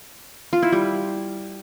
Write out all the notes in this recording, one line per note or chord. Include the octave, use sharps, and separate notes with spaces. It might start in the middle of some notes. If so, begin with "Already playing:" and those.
F4
E4
G3